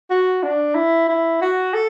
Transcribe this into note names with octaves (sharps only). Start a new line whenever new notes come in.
F#4
D4
E4
E4
F#4
A4